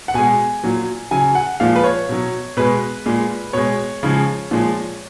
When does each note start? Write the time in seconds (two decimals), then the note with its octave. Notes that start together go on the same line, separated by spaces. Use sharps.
0.08 F#5
0.14 B2 G#3 G#5
0.63 A#2 F#3
1.11 C#3 F#3 G#5
1.35 F#5
1.60 A#2 F3 G#3 F5
1.76 B4
1.84 C#5
2.09 B2 F#3
2.57 B2 G#3 B4
3.06 A#2 G#3
3.53 B2 G#3 C#5
4.03 C#3 F3 G#3
4.51 A#2 F3 G#3